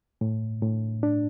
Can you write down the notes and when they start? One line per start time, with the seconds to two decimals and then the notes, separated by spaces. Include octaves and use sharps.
0.21 A2
0.62 A2
1.03 D4